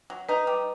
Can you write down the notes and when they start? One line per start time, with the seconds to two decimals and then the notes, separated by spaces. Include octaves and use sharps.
0.10 F#3
0.29 D#4 B4
0.47 G3